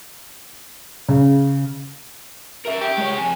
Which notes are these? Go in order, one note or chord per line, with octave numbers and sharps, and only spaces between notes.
C#3
A#4 E5
G4
G#3 C#5
F2 G#5